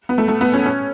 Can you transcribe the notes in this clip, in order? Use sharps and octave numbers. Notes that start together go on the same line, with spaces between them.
B3
A3
A3
B3
C#4
C#4